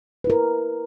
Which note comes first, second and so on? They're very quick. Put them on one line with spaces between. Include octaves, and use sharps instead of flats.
B4 E4 A#4